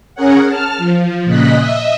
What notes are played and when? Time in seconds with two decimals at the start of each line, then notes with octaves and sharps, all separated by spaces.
0.15 C#4 G#4 A#4 C#5 F#5
0.46 A5 F6
0.78 F3
1.25 A#2 C#3 D#5 F#6 B6
1.56 D#5 E5